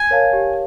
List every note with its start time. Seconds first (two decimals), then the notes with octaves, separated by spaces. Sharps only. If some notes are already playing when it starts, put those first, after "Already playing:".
Already playing: G#5
0.11 A#4 C#5 F5 A5
0.33 G4